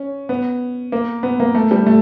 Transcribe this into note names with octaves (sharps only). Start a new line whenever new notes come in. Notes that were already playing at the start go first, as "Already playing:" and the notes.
Already playing: C#4
B3
A#3
B3
A#3
A3
G3
A3